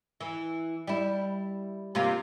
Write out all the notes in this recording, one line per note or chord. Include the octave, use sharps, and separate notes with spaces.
E3
G3 E4
C3 A#3 F4